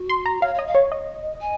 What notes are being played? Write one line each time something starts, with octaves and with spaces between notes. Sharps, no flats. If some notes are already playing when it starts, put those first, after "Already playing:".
Already playing: F#4
C6
A#5
C#5 F5
C#5 D#5
F5
C#5
D#5
G#5